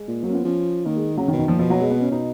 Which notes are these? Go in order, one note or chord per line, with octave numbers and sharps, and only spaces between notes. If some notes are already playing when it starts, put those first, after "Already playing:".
Already playing: G#3
A#2
F#3 A#3
C#4
F3 B3
F3 C#4
D#3 A#3
G#3
C#3 F#3
D#3
B2
D#3
A#2 F3
B2 F3
F#3
G#3
B3
C#4
B2 D#4